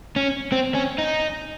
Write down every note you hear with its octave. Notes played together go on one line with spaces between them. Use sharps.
C#4
C4
C#4
D#4